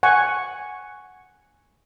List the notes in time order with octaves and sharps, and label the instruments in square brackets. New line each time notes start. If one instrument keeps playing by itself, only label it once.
[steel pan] F#5 G#5 C#6